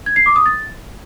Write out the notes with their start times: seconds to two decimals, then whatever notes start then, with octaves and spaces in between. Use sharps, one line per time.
0.06 G#6
0.16 C7
0.26 D6
0.36 D#6
0.46 A6